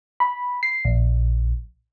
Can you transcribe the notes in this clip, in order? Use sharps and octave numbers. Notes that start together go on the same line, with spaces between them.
B5
C7
A#1